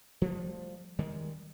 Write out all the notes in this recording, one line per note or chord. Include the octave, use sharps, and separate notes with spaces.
F3 G3 A3
D#3 G3 G#3